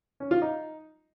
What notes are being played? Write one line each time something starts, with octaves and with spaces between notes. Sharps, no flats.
C#4
F4
D#4